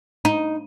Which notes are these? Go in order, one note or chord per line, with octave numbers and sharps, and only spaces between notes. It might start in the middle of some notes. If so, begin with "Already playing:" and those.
D#4